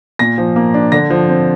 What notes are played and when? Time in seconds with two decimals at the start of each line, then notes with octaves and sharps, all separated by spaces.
0.19 A#2 A#6
0.38 F3
0.56 A#3
0.74 D4
0.92 D3 A#6
1.10 F3
1.29 C4